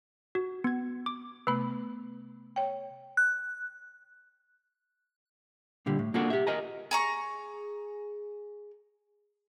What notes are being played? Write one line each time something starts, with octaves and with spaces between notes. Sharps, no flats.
F#4
B3 G#6
D6
C3 A3 B3 B4 B5
C#5 G5
F#6
A#2 D3 G3
A2
A#3 D4 F4 F#4 A4 A#4
G4 E5
A#4 D#5 G#5 A#5
G#4 A#5 C#6